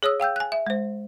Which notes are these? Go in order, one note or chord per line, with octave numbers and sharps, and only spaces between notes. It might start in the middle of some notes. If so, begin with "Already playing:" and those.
G#4 C#5 D#6 E6
F5 G5 E6 G6
G#5 F#6
E5
G#3 C5